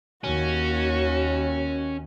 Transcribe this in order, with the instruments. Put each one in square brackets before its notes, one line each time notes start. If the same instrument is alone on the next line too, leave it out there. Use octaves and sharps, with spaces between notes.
[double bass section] D#2 [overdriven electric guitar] C#4 [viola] F#4